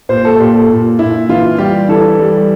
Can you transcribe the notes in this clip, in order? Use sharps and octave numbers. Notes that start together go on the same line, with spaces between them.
A#2 C5
A4
A#2 G4
A4
A#2
A#2 E4
E3 F4
G3 G4
E3 A4
G3